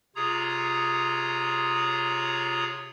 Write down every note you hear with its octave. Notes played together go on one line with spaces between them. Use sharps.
C3 F4 G#4 C#5 A#5 D#6